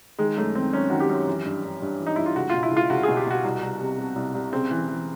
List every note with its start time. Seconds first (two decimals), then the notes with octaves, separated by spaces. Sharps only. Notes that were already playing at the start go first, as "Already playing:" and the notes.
0.19 D#3 G#3
0.37 F#2 A3
0.55 D#3 C4
0.73 F#2 C#4
0.90 D#3 F#4
1.00 G4
1.09 F#2
1.27 E3
1.45 G2
1.64 G2
1.82 G2
2.00 E3
2.06 D#4
2.16 G2 E4
2.26 F4
2.36 C#2 F#4
2.50 B2 F4
2.63 E4
2.72 C#2 F4
2.90 C#2 F#4
3.03 B2 G#4
3.17 G4
3.26 B2 F#4
3.44 C2
3.63 C2
3.81 C3
3.98 C3
4.16 C2
4.35 C2
4.52 C#3 C4
4.71 E3
4.88 E3